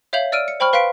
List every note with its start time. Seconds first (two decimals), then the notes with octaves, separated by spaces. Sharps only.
0.13 C#5 E5 F5 G6 F7 F#7
0.32 D5 E6 F6 D7 D#7
0.48 C#7
0.60 C5 G5 B5 C#6 F6
0.73 B4 F5 C6 B6 D7